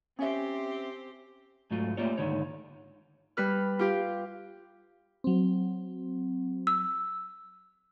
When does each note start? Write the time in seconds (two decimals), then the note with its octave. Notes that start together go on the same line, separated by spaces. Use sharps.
0.19 C4 C#4 G4 C5 E5
1.71 G#2 F#3 A3 F4
1.97 G3 A3 A#3 F4 C#5
2.18 D2 G#2 D3 D#3 C#5
3.37 G3 B4 F6
3.79 F4 G4 F5
5.24 F#3 C4
6.67 E6